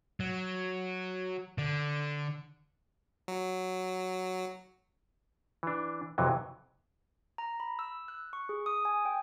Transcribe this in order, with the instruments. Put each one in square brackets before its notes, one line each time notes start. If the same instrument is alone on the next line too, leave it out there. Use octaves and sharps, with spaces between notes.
[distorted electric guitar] F#3
D3
[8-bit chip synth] F#3
[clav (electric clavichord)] E3 D4
F2 C3 E3 F#3
[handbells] A#5
B5
E6
F#6
C#6
G#4
D#6
G#5
G5